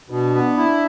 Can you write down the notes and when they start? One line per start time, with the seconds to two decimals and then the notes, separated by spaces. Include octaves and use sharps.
0.10 B2 D4
0.35 B3
0.57 E4